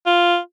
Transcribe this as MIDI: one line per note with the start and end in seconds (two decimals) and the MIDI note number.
0.06 0.38 65